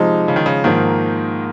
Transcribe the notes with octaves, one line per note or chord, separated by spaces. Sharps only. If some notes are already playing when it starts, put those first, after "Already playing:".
Already playing: C3 F3 G#3 D#4
C#3
D#3
C#3
G#2 D#3 F3 A#3